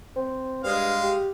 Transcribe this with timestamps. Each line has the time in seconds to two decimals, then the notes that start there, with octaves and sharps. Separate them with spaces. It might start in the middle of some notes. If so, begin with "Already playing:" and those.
0.16 C4
0.64 G2 G#3 F5
1.02 G4